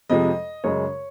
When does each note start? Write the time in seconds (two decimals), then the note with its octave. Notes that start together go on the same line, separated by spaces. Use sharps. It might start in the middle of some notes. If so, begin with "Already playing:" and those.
0.09 F2 C3 F3 G#3 D#5
0.64 F#2 C#3 G#3 C#5